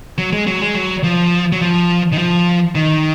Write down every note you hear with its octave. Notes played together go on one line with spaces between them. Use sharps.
F#3
G#3
F#3
G#3
F#3
F3
F#3
F3
D#3
F3
D#3